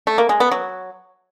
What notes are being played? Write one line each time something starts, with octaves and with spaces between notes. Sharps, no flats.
A3
A#3
G#3
B3
F#3